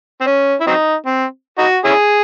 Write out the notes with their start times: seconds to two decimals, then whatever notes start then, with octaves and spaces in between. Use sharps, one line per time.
0.21 C4
0.27 C#4
0.61 E4
0.67 F#3 C4 D#4
1.06 C4
1.58 D#4 F#4
1.85 C#4 E4 G#4